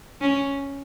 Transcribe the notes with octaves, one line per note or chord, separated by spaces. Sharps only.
C#4